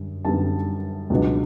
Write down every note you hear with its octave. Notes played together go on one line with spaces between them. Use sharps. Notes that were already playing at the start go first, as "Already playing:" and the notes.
Already playing: F#2 D3 G3
F#2 D3 G3 B3 A5
C#2 B2 F#3 B3 D4